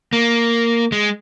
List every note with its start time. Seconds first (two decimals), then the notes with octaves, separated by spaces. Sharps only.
0.13 A#3
0.92 G#3